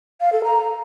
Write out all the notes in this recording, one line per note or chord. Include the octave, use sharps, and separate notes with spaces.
F5
A4
A#5